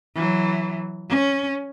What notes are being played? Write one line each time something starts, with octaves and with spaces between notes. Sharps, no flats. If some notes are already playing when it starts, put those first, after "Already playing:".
E3 F#3
C#4